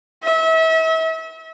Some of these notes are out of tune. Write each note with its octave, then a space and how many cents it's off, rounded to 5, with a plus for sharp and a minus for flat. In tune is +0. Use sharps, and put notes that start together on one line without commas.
E5 -35